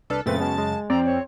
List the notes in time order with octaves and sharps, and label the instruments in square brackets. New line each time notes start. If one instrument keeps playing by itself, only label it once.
[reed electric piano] C2 D4 F6 [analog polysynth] A4 [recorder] B4
[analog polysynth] F#2 C#3 A6 [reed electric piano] A#2 A3 C4 [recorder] B4
[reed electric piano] G#3 B3 C#4 [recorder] A5
[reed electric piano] G#3
[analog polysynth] F2 [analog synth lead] C4 [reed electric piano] D5 [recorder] A#5
[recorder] C#5